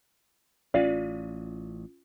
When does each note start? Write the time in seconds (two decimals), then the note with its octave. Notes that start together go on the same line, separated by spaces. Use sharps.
0.74 A1 C#4 F4 D5 F5